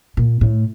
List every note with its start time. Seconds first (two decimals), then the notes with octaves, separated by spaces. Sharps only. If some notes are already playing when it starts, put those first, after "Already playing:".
0.17 A#2
0.41 A2